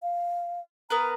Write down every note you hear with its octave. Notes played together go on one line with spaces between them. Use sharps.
F5
B3 A#4 B4 A#5